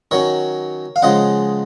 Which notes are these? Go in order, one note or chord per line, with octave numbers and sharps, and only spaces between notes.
D#3 F#3 C#4 A#4 C#5
F5
C#3 F3 G#3 D#5 F#5